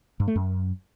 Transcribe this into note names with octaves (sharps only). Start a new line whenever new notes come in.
G2
A3
F#2